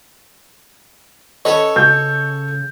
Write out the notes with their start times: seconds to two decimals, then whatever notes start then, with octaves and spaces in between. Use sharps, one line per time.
1.45 C#4 A4 B4 C#5 D#5
1.76 C#3 G6